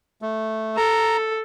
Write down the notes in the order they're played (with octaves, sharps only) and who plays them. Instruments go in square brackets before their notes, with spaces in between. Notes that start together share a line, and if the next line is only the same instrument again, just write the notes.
[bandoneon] A3
[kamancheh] A4 [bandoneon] A#5